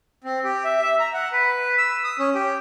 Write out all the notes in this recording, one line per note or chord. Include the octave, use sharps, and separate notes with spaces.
C4
G4
E5
E5
A#5
F#5
B4
E6
D#6
C#4
G4